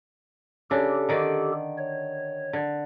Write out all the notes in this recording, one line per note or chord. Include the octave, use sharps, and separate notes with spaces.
C#3 D4 G4 A4
D3 D#3 D5
C#5
D3